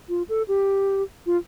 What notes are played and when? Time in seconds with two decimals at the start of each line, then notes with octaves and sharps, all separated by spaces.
0.09 F4
0.29 A4
0.48 G4
1.26 F4